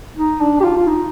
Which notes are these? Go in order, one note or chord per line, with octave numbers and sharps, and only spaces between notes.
D#4
D4
G4
F4
F4
D#4